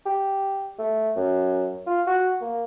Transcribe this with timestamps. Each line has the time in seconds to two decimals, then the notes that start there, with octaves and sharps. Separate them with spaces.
0.06 G4
0.79 A3
1.16 F#2
1.86 F4
2.07 F#4
2.41 A#3